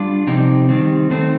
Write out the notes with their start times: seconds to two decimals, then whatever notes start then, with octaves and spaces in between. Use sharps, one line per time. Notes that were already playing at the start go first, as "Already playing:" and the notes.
Already playing: G3 D4 F4
0.27 C3 F3 C4 D#4 G4
0.69 D#3 G3 C4
1.10 D#3 A3 C4